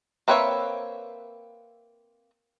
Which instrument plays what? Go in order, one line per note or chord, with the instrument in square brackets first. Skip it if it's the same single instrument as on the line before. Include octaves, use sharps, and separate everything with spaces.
[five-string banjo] A#3 C4 B4 C#5 E5